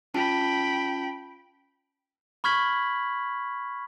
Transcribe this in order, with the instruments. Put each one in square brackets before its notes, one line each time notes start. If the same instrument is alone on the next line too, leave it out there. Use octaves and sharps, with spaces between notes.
[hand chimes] C#4 F4 A5 [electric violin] G5 B5
[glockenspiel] B5 C#6 F6 G#6 B6 F#7